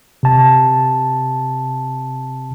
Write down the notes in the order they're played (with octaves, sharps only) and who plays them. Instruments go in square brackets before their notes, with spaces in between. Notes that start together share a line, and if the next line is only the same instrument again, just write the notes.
[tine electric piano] C3 A5